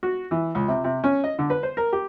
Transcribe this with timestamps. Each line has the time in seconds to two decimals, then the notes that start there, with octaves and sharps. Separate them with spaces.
0.03 F#4
0.31 E3
0.55 C#2
0.68 C3
0.84 C3
1.04 C#4
1.24 D#5
1.39 D3
1.50 B4
1.63 C5
1.77 A#4
1.93 G4